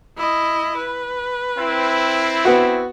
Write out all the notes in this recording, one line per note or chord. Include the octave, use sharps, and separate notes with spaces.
E4 D#5
B4
C4 E4
B3 F#4